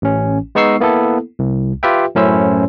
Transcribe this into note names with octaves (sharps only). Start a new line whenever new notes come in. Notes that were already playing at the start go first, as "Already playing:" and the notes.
A1 C#4
G#3 B3 D#4 C#6 E6 C7
A#3 B3 E4 A4
C2
F4 G4 B4 E5 G5
F#2 A2 C#4 E4 C5 E6